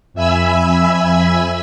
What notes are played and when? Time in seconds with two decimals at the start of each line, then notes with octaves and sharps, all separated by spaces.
0.14 F2 E5 G#5 B5 E6